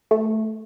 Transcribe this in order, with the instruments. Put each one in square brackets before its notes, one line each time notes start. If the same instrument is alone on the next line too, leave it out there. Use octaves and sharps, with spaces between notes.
[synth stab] A3